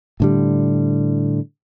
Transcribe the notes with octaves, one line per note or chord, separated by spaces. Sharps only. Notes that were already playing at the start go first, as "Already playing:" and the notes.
A2 D3 G3